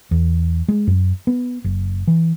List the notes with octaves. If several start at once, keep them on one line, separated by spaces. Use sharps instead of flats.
E2
G#3
F#2
B3
F#1
E3